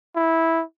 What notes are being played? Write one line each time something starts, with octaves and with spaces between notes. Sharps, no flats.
E4